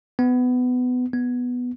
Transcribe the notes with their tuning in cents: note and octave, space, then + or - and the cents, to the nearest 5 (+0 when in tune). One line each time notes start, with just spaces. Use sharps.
B3 +20
B3 +0